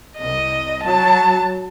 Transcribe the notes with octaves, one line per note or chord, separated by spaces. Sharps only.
C2 D#5
F#3 A5